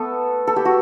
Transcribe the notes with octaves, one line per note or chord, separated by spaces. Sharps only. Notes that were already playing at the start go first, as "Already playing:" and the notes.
Already playing: A3 B3 A4
A4
G4
F#4